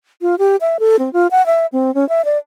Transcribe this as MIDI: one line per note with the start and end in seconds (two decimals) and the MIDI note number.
0.22 0.35 65
0.39 0.56 67
0.61 0.77 76
0.80 0.96 69
0.99 1.12 60
1.13 1.27 65
1.31 1.45 78
1.46 1.66 76
1.73 1.94 60
1.95 2.07 61
2.09 2.25 76
2.25 2.37 74